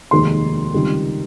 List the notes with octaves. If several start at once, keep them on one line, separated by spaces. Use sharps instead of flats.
F1 D#2 D#3 G#3 C6
C#2 C3 D#3 G3